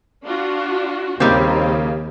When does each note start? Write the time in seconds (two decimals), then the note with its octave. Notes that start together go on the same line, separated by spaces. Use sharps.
0.24 D4 F4 F#4
1.20 D#2 C#3 G3 A#3 C4 D#4 G4